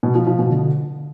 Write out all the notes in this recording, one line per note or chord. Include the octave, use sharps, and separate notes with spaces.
B2
F3
F3
B2
D3